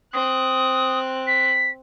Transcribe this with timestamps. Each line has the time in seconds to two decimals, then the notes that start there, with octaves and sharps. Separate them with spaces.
0.14 C4 D#6 F#6
1.27 B6